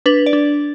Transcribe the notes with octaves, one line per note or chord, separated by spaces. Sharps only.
D4 B4
D5
D4